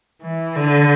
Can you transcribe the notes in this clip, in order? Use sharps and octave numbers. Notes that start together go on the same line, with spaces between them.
E3
D3